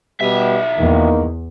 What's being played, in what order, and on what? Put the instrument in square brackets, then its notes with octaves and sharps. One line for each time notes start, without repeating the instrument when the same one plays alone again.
[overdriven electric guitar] B1 E5 [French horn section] B2 G3
[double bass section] E2 [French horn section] D#3 A#3